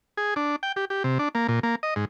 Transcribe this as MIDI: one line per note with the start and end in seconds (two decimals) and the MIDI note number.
0.17 0.34 68
0.36 0.56 62
0.63 0.72 79
0.76 0.85 67
0.90 1.03 67
1.04 1.18 48
1.19 1.29 62
1.35 1.47 58
1.48 1.60 46
1.63 1.75 58
1.83 1.94 75
1.96 2.05 44